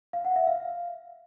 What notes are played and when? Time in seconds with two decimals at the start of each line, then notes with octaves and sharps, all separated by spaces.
0.13 F5
0.25 F#5
0.36 E5
0.47 F5